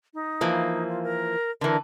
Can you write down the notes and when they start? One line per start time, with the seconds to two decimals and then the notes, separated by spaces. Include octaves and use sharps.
0.14 D#4
0.41 E3 F3 A#3
0.88 F4
1.03 A#4
1.61 D3 E3 A#4